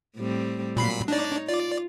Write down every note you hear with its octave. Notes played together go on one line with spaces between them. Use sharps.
A2 G3 C4
A#2 F#3 B5 C7
D4 D#4 C#5 D5
F4 D5